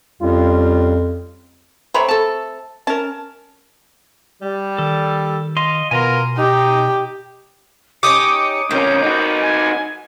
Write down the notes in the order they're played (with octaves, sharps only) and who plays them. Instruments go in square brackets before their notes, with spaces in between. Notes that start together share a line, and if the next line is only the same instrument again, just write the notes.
[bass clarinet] F2 [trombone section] G3 C#4 F4
[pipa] A3 C4 C#6 [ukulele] C#5 A#5 B5
[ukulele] A4 A5
[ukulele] C#4 A#4 [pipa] A5
[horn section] G3
[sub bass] D#3 [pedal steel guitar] A4
[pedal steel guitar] D#5 F5 C6
[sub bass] B2 [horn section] B3 F4 A#4 [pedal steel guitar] G#5 A#5 C6
[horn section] D#4 [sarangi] G4
[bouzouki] C#4 D#4 G4 [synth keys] D6 D#6 [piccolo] C#7
[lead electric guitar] B1 C#4 [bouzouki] C4 A#4 [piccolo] G6
[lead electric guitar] D#4 F#4
[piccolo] G#5